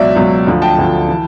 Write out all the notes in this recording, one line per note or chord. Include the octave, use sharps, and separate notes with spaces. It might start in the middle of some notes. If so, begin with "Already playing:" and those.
Already playing: C#2 B2 F#3 D5 E5
C#2 B2 F#3
D2 D3 F3
G5 A5
D2 D3 F3
E3